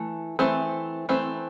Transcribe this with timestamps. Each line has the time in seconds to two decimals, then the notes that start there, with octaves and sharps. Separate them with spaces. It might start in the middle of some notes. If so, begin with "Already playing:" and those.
Already playing: E3 A3
0.39 E3 A3 C4
1.09 E3 A3 C4